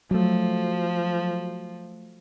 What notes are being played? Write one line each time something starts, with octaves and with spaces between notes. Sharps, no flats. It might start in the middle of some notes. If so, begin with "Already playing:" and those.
F3 F#3 A3